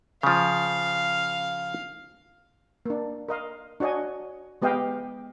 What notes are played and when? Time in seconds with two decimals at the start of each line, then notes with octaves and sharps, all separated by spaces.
0.23 C#3 F3 F5
2.86 A#3 D4
3.29 A#4 D#5 F5
3.80 D4 F#4 C#5 D#5 G#5
4.62 G#3 B3 G4 D#5 F5 G5